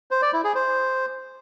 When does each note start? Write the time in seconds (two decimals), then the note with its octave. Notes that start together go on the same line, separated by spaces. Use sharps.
0.11 C5
0.22 D5
0.33 E4
0.44 G#4
0.55 C5